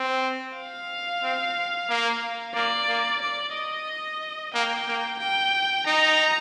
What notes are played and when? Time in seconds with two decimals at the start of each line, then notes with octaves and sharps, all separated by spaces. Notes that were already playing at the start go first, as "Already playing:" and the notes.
Already playing: C4
0.57 F5
1.23 C4
1.89 A#3
2.55 A#3 D5
2.88 A#3
3.22 D5
3.54 D#5
4.54 A#3 G5
4.87 A#3
5.20 G5
5.86 D#4 A#5